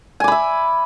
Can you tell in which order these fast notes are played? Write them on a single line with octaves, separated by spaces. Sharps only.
G#5 D6 B5 E5